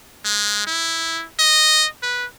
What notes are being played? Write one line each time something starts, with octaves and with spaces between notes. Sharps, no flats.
G#3
E4
D#5
B4